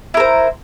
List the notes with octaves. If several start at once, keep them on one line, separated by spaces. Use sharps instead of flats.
E4 A#4 C5